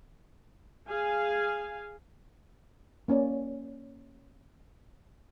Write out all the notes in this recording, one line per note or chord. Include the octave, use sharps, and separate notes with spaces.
G#4 F5 G#5
A#3 C#4 C#5 D5